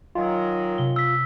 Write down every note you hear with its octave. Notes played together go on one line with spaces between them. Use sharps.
D#3 F#3 F4 F#5 G#5 C6
C3 G7
E6 B6